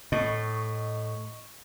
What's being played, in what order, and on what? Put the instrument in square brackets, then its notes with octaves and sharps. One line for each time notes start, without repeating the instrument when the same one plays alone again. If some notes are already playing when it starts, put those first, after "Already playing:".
[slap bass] A2 [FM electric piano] D#5 C#6